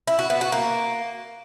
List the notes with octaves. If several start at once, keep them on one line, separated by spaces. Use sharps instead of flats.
E4
F#4
B3
F#4
A#3